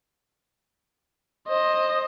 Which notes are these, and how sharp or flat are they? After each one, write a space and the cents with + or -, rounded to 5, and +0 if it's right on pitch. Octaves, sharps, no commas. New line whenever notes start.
C5 +20 D#5 +0